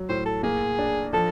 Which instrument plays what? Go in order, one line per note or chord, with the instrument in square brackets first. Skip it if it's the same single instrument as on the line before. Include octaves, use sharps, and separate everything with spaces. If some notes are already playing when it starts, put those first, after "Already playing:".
Already playing: [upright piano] F#3
[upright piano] A2 [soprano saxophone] C5
[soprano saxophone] A4
[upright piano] A#3 [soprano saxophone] G#4
[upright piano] D4
[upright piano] F3 [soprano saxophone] A4